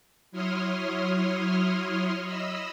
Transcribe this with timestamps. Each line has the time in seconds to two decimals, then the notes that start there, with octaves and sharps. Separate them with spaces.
0.31 F#3 E4 C#5 C6 D#6 F6
2.22 D#5 B5 E6